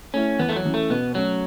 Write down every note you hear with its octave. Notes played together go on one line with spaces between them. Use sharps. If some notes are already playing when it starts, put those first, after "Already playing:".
A3 C#4 E4
E2 B3
A3
F#3
E3 C#4
A3
B2 B3
F#3 A3 C#4